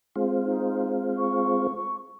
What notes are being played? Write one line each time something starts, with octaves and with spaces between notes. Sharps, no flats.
G#3 C4 F4
D#4
C#6